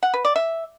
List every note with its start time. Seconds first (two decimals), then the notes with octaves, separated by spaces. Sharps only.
0.03 F#5
0.14 B4
0.25 D5
0.36 E5